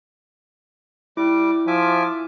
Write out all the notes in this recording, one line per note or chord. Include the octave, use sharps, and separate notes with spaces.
G3 E4 D6
F3 E5 G#5 D6